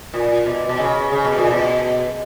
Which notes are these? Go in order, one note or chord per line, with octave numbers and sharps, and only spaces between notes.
A#2
B2
B2
C#3
C#3
B2
A#2
B2